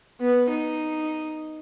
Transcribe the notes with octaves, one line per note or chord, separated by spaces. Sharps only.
B3
D#4